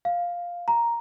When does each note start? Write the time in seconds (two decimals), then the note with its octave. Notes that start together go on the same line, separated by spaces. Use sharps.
0.05 F5
0.68 A#5